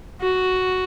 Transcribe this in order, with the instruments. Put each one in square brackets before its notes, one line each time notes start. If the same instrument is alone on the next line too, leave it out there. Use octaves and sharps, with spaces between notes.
[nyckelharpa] F#4